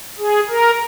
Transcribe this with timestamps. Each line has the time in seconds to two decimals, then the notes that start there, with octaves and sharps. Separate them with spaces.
0.18 G#4
0.49 A#4